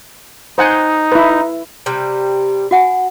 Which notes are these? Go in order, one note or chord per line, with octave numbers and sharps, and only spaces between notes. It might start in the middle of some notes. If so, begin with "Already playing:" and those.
D#4 C5 F#5 G#5
E4 B4
C3 G3
F#4 F#5 G#5